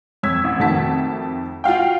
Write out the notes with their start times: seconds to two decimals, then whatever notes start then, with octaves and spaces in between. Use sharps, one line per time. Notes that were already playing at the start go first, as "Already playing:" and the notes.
0.23 F2 C#5 E6 G#6 B6
0.44 A1
0.60 F2 D#3 A3 F#4 A5 B6
1.64 F4 F#4 F5 G5